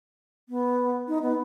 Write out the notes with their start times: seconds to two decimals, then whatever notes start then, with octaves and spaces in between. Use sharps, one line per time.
0.49 B3
1.08 D#4
1.22 B3